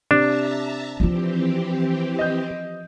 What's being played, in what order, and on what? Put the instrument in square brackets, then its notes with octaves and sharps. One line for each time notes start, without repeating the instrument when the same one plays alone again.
[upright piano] C3 E7 [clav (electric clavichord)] D4 [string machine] E5 A5 A#5
[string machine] E3 C4 G4 [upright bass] F3 F4
[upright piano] D#5 G6